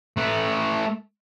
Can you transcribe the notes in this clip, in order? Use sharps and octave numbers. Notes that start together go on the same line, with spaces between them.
A3 B4